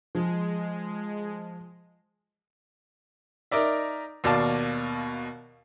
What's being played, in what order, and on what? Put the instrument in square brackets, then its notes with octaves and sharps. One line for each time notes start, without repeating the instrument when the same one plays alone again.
[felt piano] F3 [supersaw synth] G#3
[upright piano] D#4 A#4 D5 E5
D#2 B2 D5 F5 A5